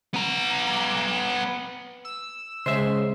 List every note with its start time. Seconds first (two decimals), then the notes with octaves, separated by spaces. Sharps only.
0.14 B3 A#5
2.05 E6
2.66 C#3 G#3 C5 E5